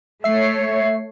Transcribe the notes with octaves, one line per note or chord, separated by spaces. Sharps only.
A3 C#5 E5 C7